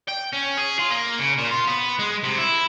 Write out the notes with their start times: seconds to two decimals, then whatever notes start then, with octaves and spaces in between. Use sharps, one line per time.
0.08 G5
0.33 C#4
0.57 G#4
0.79 F4
0.90 A#3
1.19 C#3
1.38 A#2
1.51 F4
1.68 B3
1.99 G#3
2.23 C3
2.38 E4